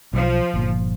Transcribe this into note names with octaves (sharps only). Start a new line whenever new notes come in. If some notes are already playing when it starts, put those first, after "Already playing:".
B1 F3
G1 A#2